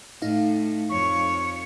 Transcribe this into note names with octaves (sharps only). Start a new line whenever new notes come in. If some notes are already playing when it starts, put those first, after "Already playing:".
A2 D#4 F5
F2 C#5 C#6